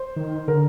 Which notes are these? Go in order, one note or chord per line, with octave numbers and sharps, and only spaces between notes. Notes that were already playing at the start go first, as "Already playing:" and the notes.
Already playing: C5
D#3
D3 A#4